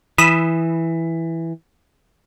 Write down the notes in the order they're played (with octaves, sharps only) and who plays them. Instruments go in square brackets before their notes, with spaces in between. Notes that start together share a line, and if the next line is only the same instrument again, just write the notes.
[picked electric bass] E3 [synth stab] B5 D#6 E6